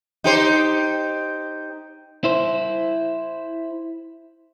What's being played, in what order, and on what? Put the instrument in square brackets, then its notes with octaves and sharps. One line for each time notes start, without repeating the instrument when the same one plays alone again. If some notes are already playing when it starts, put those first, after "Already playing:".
[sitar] D#4 G4 C5
[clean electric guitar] E4 C5